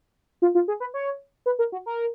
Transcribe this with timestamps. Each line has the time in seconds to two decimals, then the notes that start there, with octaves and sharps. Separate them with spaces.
0.42 F4
0.55 F4
0.68 G#4
0.80 B4
0.94 C#5
1.46 B4
1.59 A#4
1.72 F#4
1.86 A#4